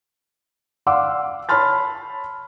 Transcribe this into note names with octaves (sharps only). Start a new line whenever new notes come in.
D5 F5 F#5 C6 D6 E6
C#5 A5 B5 C6 F6 A6